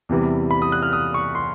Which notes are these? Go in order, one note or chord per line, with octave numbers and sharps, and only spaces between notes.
E2 C3 E3 G3
B5
D#6
F#6
F6
D#6
C#6
C6